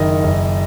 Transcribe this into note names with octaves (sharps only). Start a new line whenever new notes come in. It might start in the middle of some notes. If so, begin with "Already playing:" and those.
Already playing: F#1 D#3 D#5
F#1